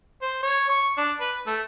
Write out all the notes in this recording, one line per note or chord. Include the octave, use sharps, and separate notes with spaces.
C5
C#5
C#6
D4
B4
A3